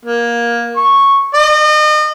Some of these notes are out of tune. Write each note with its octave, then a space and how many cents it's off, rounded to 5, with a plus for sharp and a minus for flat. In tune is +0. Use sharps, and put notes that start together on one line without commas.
A#3 +15
C#6 -5
D#5 -35